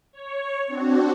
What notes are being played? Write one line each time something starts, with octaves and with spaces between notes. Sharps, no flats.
C#5
C4 D4 F#4